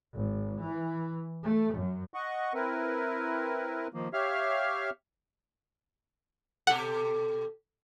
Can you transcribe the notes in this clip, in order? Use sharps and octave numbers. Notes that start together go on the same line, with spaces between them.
G#1
E3
A3
F#2
D#5 F#5 C#6
C4 E4 A#4 B4
D#3 F3 A#3
G4 C#5 E5 F5 F6
B2 G4 A4 F#5